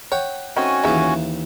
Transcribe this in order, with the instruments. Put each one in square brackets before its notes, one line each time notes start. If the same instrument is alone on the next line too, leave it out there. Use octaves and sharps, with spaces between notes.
[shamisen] C#5 [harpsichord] F#5 G5
[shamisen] D#3 A3 C4 [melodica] C#4 F#4 G#5
[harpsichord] D#2 E3 [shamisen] C#3 E5